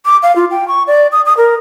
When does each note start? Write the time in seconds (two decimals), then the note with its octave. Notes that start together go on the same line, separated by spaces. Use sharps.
0.06 D6
0.23 F5
0.36 F4
0.51 G5
0.68 C#6
0.87 D5
1.12 D#6
1.26 D#6
1.37 A#4